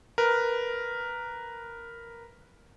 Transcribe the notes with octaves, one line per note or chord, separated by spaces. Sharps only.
A#4 B4